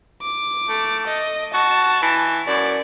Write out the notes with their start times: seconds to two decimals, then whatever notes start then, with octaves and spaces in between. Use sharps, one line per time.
0.22 D6
0.69 A3
1.07 D#5
1.54 F#4 A5
2.02 E3
2.47 F#2 D5